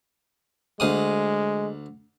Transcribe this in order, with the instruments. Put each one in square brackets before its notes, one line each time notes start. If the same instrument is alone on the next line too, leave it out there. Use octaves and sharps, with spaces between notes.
[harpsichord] D2 F5 D#6 [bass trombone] G#3